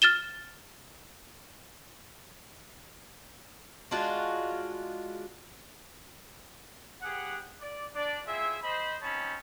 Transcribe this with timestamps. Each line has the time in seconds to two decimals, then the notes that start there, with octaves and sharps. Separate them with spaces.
0.02 F6 A6 E7 G7
3.91 G#3 D4 F4 F#4
7.02 B3 G4 G#4 F#5
7.60 D5
7.94 D4 D5
8.26 C4 E4 F4 G#4 E5
8.63 C5 D#5 B5
9.02 C4 C#4 D#4 C#5 A5 B5